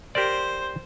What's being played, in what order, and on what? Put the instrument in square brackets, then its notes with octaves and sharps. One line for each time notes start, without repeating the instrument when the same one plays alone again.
[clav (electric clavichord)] G4 A#4 D5 [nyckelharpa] C5